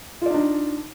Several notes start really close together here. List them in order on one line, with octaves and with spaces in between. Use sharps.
F4 D5 D#4 D4